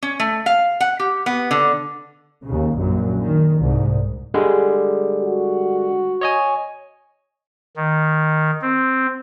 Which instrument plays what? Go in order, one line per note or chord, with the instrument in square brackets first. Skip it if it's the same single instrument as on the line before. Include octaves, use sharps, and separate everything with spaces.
[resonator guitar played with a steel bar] C#4
A3
F5
F#5
G4
B3
D3
[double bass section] D#2 C#3
A#1 F#2
D#3
C2 G#2
[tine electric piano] D3 G3 G#3
[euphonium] F#4
[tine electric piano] C#5 D#5 G#5
[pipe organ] D#3
C4